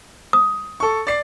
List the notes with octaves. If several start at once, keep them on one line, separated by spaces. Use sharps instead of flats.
D#6
A4 C#6
D5 C7